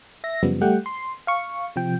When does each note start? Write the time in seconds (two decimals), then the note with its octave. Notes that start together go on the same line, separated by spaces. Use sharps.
0.24 E5 A#6
0.43 F#2 C#3 F3 G3 B3
0.61 G3 A3 G4 F#5 G5
0.86 C6
1.27 F5 C#6
1.76 C3 F3 G5